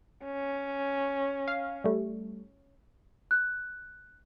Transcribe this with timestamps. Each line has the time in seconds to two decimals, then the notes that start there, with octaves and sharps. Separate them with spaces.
0.24 C#4
1.48 F5
1.84 G3 A3
3.31 F#6